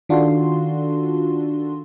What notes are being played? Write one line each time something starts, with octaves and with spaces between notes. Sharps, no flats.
D#3 D4 F4 F#4 A4 C6